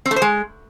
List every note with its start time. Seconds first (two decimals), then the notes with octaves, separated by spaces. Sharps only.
0.06 C4
0.11 A3
0.16 C5
0.22 G#3